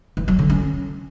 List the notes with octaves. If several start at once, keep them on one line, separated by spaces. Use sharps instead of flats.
E3
F#3
D3
C#4